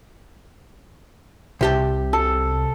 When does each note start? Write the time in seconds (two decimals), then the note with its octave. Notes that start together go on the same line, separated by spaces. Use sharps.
1.61 C2 C3 G4 A5
2.13 A4